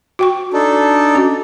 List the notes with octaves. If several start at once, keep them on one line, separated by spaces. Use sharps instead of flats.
F#4 G5 C#6
D4 D#4 A4
C#4 F#4